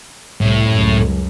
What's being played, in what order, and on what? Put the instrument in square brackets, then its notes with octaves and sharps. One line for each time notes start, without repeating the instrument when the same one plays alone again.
[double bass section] C2 C3 G3 [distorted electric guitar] A2
[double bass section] C#2 F#2